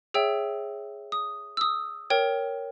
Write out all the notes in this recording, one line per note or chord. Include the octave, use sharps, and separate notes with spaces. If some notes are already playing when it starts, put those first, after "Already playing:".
G#4 C#5 E5 G5 E6
D#6
E6
D#6
A#4 C#5 G5